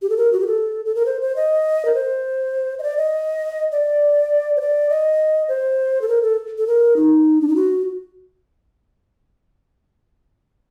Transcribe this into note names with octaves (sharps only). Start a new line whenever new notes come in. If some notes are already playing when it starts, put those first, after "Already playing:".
G4
A4
A#4
F#4
G4
A4
A4
A#4
C5
C5
D#5
A#4
C5
D#5
D5
D#5
D5
C5
D5
D#5
C5
A4
A#4
A4
A4
A#4
D#4
D4
D#4
F#4